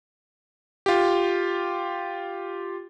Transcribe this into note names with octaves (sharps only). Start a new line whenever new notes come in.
F4 G4